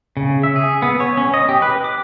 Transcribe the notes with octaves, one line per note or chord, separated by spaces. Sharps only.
C#3
E5
G#4
B3
C#5
C#4
D#5
G4
B4
D6